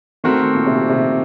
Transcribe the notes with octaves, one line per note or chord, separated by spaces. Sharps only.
D#3 A3 C4 F#4 A#4
A#2
C3
C3